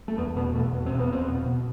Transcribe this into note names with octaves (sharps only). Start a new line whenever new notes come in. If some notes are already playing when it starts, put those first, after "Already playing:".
A3
E2 B3
B2 B3
E2 A3
B2
C4
E2
B3
E2 C4
B2
B2